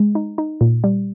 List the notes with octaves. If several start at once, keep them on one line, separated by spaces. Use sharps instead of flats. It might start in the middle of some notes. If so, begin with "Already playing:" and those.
Already playing: G#3
D#4
D#4
A#2
G3